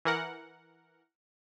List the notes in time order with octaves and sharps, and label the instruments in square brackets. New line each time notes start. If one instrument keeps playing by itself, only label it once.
[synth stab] E3 A#4 F#5